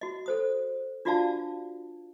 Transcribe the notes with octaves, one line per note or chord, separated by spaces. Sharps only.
F#4 D#5
A4 C5 D#6
D4 F4 F#4 D5 F5 A5